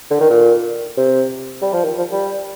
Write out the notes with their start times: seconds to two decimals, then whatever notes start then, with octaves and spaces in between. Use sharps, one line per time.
0.11 D3
0.20 D#3
0.30 A#2
0.97 C3
1.62 G3
1.73 F3
1.84 D#3
1.98 F3
2.12 G3